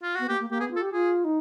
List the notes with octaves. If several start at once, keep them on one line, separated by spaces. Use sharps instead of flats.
F4
B3 F#4
A#3 G4
A#3
A#3 G4
B3 G#4
F4 A4
G4
F4 G#4
D#4